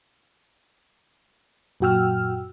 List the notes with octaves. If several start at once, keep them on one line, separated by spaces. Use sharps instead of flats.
F#2 A#2 F#4 G5 E6 F6